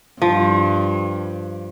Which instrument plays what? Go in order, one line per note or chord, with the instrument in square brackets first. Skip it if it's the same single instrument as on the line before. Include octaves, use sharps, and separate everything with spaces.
[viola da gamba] G2 [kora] F3